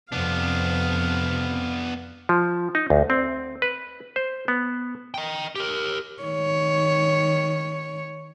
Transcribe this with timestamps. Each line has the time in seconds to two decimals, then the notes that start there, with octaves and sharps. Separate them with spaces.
0.12 F2 C3 B3 D4 F5
2.29 F3
2.75 D#4
2.90 D2
3.10 C4
3.62 B4
4.16 C5
4.48 B3
5.14 D#5 G5
5.56 G4 A#4
6.23 D#3 C#5